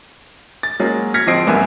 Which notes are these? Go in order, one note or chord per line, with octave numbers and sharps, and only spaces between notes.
A6
F#3 G#3 A#3 C#4
F6 G#6 A#6 B6 C#7
D1 F3 C4 D#5 C7 D7
C2 F#2 B3 A#4 E5 G#5